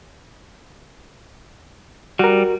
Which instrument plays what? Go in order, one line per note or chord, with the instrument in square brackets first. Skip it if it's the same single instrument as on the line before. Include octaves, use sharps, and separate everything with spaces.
[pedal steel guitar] G3 [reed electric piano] F#4 A#4